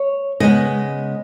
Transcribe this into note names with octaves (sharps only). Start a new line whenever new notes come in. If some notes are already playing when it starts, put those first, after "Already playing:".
Already playing: C#5
C#3 G#3 B3 D#5